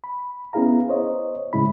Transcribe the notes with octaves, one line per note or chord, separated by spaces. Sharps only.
B5
B3 C#4 E4 G#4 F5 A#5
C5 C#5 D#5
A2 C#3 G#3 E4 B5